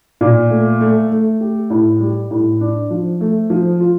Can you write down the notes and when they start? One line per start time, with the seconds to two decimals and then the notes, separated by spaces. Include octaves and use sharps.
0.21 A#2
0.50 A3
0.81 A3
1.11 A3
1.41 G4
1.70 A2
2.00 G3
2.31 A2
2.61 D4
2.90 F3
3.21 A3
3.50 F3
3.80 F4